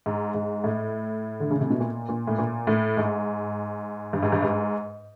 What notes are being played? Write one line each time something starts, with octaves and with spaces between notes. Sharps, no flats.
G#2
G#2
A2
D3
C#3
C3
B2
A#2
A#2
A2
A#2
A2
G#2
G2
G#2
G2
G#2